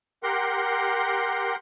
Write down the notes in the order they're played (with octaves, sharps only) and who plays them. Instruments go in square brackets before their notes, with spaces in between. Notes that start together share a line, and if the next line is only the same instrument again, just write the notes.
[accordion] G4 A#4 F#5 C6